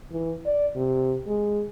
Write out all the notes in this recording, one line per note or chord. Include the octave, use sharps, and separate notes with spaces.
E3
D5
C3
G#3